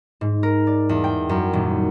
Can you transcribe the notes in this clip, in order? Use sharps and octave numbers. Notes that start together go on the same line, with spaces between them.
G#2
A#4
D5
E2
G5
F#2
D#1